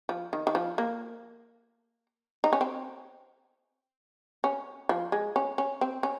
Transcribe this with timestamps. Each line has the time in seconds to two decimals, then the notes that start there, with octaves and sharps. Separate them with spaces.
0.09 F3
0.33 D#3
0.47 D#3
0.55 F3
0.78 A#3
2.44 D#4
2.53 C#4
2.61 C4
4.44 C#4
4.89 F3
5.12 G#3
5.36 C#4
5.58 C#4
5.81 C4
6.03 C#4